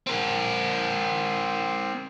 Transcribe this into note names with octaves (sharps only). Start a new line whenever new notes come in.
C4 A#4